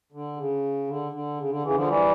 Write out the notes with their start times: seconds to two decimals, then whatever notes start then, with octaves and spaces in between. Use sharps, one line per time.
0.12 D3
0.37 C#3
0.87 D3
1.12 D3
1.37 C#3
1.50 D3
1.62 C#3 E3
1.75 D3 F3
1.87 E3 G3